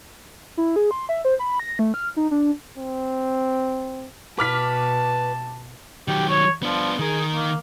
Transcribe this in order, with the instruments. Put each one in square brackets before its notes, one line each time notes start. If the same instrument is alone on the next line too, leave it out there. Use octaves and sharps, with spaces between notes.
[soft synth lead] E4
G#4
C6
E5
C5
B5
A#6
A3
F6
D#4
D4
[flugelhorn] C4
[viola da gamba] B2 [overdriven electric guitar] B4 [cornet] A5 [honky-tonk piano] D6 F6 B6
[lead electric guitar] D#3 F#3 [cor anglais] G4
[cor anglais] C#5
[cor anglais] F3 [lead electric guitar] B3 D4
[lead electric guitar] D#3 A#4 [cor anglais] G#4
[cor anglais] A#3